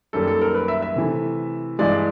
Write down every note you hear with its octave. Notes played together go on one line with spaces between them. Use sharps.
F#2 D#3 G3 A#3 A4
A4
A#4
B4
E5
E5
C3 E3 A3
G2 E3 G#3 D5